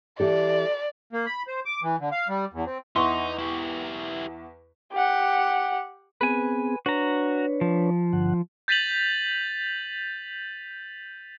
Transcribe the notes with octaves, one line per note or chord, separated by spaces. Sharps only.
E3 G4 A4 D5
A#3
B5
C5
D6
E3
D3
F5
G3
E2
C4
E2 D#4 E5 F#5 C6 C#6
E4 G4
G4 F#5
B3 C4 G#4 B4 G#5
D4 F#4 B4 C#5 A#5
F3
G2 D3 F#5
G6 A6 B6 D#7 F7 F#7